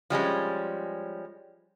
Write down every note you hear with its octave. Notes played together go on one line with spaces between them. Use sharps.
F3 G3 G#3 C#4